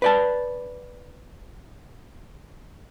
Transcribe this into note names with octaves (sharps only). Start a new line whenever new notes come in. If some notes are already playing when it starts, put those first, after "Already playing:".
B4 D5 A5